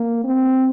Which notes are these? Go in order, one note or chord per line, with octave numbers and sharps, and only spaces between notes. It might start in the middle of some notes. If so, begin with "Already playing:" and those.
Already playing: A#3
C4